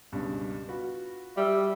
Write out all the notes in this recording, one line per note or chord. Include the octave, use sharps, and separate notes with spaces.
C#2 G2 B2
F4 F#4 B4
G3 E5